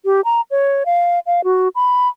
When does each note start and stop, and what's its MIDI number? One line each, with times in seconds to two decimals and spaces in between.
0.05 0.21 67
0.25 0.41 82
0.51 0.84 73
0.86 1.19 77
1.26 1.44 77
1.44 1.68 66
1.75 2.08 83